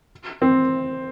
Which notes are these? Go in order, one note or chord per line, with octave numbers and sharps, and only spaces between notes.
C4